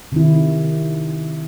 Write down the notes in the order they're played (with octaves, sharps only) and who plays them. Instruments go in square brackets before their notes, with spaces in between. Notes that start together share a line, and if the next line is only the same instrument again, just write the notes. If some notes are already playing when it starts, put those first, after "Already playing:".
[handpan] C3 D#3 E4